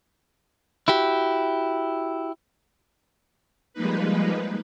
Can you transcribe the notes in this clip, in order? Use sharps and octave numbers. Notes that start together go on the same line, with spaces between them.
E4 F#4 G4
F3 G3 G#3 A#3 D#4 B4